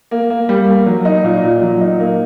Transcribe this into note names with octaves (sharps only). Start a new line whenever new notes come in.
A#3
A#3
G3
A#3
F#3
D#4
A#2
A#2
F#3
D#4
A#3